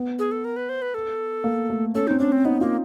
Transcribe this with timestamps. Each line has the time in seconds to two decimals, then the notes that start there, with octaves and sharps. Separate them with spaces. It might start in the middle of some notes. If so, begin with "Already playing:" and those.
Already playing: B3
0.19 G#4
0.31 A4
0.45 A#4
0.56 B4
0.69 C5
0.82 B4
0.94 A4
1.44 A#3
1.70 A3
1.95 C#4 A4
2.07 C4 D#4
2.19 C#4 D4
2.32 C4
2.45 B3 D#4
2.61 A#3 F4